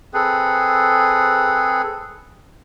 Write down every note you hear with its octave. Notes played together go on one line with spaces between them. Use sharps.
C4 G#4 A4 B4